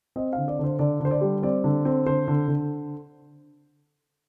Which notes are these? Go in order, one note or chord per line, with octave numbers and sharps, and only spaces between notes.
C4 D#5
D3 F5
D5
D3 C5
D3 D5
D3 C5
D5
G3
C4 D5
D3
C4
D3 C5
D3
D3